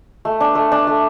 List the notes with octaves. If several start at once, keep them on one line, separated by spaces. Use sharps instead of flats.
A3
D4
A3
D4
A3